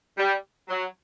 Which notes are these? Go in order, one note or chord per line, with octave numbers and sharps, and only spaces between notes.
G3
F#3